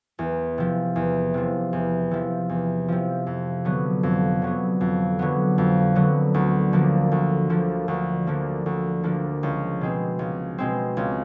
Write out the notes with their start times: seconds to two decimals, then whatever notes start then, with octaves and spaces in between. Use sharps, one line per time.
0.19 E2
0.58 C3 F3
0.96 E2
1.34 C3 F3
1.73 E2
2.11 C3 F3
2.49 E2
2.88 C3 F3
3.27 F2
3.65 D3 F#3 B3
4.03 F2
4.42 D3 F#3 B3
4.81 F2
5.19 D3 F#3 B3
5.58 F2
5.95 D3 F#3 B3
6.34 D2
6.73 D3 F3 A#3
7.12 D2
7.50 D3 F3 A#3
7.88 D2
8.27 D3 F3 A#3
8.66 D2
9.03 D3 F3 A#3
9.43 C#2
9.81 B2 G#3 C4
10.19 C#2
10.58 B2 G#3 C4
10.97 C#2